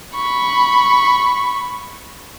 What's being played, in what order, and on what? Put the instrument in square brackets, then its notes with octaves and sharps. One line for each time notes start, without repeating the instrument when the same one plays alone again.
[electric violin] B5 C#6